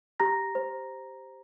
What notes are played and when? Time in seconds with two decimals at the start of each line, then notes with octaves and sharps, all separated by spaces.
0.20 G4 A#5 A#6
0.55 C5